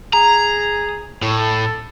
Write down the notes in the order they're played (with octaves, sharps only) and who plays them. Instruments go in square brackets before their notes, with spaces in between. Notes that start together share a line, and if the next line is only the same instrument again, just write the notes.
[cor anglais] G#4 [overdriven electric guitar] A#5
[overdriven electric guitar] A2 [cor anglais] C#5
[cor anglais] A4